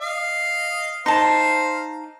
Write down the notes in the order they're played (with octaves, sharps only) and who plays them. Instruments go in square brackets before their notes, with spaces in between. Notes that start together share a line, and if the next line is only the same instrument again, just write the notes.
[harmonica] D#5 F5
[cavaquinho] D#4 A5 [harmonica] C5 F5